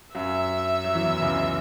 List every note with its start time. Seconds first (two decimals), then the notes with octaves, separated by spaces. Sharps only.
0.15 F#2 F#3 E5
0.84 F#3
0.95 E2 E3
1.22 C#2 C#3